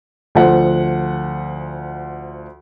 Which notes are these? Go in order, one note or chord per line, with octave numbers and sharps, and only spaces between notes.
D2 F3 F#5